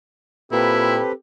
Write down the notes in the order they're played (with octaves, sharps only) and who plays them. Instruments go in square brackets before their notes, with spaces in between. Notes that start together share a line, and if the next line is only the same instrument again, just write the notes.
[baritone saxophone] A#2 [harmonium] C4 G4 A4 [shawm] E4 [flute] B4